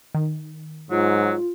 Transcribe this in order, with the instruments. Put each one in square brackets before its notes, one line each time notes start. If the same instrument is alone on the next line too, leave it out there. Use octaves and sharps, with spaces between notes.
[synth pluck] D#3
[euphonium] G#2 [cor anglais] F#3 [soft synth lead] F4